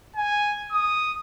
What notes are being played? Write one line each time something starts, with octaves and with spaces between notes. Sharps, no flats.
G#5
D#6